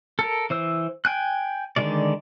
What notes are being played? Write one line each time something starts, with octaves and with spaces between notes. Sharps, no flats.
A4 A#4
E3 C5 E6
G5 G#5 F#6
D3 D#3 G3 G#3 D5